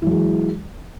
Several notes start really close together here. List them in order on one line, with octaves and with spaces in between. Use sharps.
E3 F#3 G#3